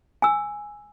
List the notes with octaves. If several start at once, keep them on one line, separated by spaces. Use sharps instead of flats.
G#5 E6